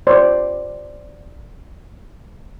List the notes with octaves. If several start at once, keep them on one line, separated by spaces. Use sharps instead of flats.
C5 D5